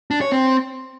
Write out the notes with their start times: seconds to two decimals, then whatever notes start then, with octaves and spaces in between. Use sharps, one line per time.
0.11 D4
0.21 C#5
0.32 C4